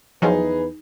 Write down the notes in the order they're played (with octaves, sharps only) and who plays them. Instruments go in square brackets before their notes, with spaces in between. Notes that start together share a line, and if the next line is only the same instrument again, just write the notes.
[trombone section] E2 B4 [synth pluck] F3 F#3 [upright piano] D#4 G#4